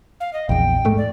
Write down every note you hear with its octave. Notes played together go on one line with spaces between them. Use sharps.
F5
D#5
A#1 E2 G5
G#2 A3
D5